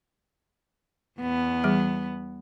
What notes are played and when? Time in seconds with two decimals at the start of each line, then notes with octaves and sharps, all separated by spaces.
1.21 E2 B3
1.64 E3 G3 G#4